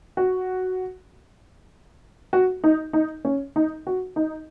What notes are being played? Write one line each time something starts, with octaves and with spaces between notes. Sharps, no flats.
F#4
F#4
D#4
D#4
C#4
D#4
F#4
D#4